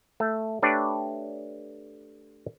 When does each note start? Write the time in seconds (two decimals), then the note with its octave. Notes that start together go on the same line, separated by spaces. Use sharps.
0.20 A3
0.62 A3 D4 G4 B4 C#5 D5